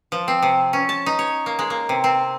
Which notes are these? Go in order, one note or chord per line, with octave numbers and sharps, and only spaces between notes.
F3
C4
C3
C#4
A5
D#4
C#5
A#3
G#3
A#3
C3
C4